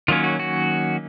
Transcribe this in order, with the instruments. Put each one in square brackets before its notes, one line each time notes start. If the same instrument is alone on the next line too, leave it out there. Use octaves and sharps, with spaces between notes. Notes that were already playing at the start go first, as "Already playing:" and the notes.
[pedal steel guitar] D#3 F#3 A#3 C#4 F4
F#4
F#4